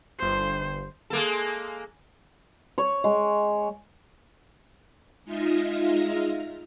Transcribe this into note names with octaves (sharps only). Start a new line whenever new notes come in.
G1 C5 C7
G#3 A#3 A4
C#5
G#3
G#3 D#4 F4 E5 F6 A#6